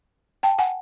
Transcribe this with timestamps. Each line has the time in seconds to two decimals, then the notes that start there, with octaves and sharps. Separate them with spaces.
0.43 G5 A5
0.58 F#5 G#5